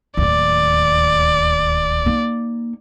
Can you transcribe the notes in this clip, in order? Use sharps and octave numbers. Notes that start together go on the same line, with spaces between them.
D1 D#2 D5
A#3 D#4